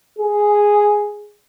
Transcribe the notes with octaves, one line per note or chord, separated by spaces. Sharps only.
G#4